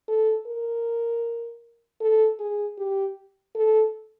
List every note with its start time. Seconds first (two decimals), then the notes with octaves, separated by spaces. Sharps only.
0.08 A4
0.47 A#4
2.01 A4
2.40 G#4
2.78 G4
3.56 A4